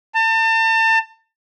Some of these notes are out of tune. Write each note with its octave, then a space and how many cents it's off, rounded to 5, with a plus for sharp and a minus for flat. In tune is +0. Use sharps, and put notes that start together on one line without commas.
A5 +35